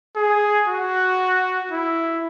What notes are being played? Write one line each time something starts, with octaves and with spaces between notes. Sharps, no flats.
G#4
F#4
E4